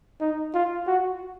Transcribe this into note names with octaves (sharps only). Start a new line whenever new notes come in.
D#4
F4
F#4